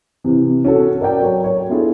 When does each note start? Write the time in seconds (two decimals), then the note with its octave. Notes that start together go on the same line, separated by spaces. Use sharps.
0.24 C3 E3
0.65 C#4 F#4 A4
1.00 A#4 D5 G5
1.21 F#3 C#5
1.44 C#5
1.70 B3 D4 E4 F4 G#4 A4